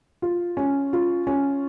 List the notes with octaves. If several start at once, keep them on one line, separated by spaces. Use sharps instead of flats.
F4
C#4
F4
C#4